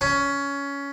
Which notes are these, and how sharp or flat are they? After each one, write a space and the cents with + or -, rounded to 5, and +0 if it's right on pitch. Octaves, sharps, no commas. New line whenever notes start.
C#4 +15